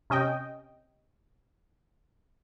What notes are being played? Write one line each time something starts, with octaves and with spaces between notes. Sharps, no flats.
C3 C#4 D#5 G5